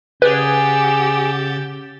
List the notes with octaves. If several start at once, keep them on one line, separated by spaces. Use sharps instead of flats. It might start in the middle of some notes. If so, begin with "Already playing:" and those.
C#3 G4 G#4 B4 F#5 E6 G6 A6